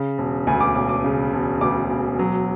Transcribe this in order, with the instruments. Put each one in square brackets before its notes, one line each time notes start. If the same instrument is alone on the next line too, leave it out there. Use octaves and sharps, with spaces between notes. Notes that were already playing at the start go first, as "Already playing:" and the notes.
Already playing: [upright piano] C#3
E1
D2 G#5
D6
E1 D6
D6
C#3
E1
D2 D6
E1
F#3